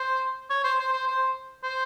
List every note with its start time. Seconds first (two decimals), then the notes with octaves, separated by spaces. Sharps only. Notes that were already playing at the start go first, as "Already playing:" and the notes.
Already playing: C5
0.50 C#5
0.64 C5
0.79 C5
0.93 C5
1.08 C5
1.63 C5